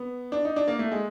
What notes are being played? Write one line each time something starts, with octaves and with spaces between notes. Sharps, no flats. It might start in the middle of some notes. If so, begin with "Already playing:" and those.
Already playing: B3
D4
D#4
D4
A#3
A3
G#3